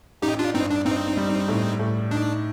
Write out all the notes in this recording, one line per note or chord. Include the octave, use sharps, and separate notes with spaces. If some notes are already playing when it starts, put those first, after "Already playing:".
A1 D#4 G4
D4 F4
G2 C4 D#4
D4
G2 C4 D#4
G3
A2
A2
D4 D#4